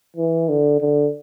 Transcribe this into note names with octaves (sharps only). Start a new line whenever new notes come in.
E3
D3
D3